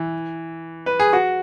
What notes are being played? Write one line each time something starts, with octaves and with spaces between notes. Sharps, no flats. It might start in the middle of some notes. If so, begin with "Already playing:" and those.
Already playing: E3
B4
G#4
F#4